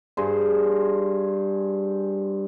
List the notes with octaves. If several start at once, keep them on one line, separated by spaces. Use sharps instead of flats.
G2 G#4 C5